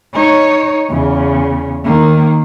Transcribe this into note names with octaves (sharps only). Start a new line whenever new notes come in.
D#4 C#5
E2 C#3
D#3 A#3